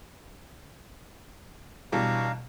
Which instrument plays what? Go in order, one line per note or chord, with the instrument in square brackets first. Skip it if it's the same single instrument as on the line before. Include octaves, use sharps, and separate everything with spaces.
[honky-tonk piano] B2 E3 G3 [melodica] D4 F5 A#5